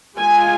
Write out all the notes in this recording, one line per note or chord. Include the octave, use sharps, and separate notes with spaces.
G#3 F4 G#5